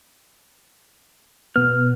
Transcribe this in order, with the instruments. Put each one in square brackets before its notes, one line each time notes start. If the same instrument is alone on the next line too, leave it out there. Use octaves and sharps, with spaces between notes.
[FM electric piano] B2 B3 [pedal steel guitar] F6